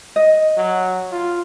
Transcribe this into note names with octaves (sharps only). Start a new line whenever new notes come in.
D#5
F#3
F4